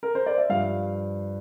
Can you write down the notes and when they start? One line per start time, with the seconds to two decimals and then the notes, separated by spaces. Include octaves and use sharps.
0.03 A#4
0.15 C5
0.26 D5
0.38 E5
0.50 G2 F3 F5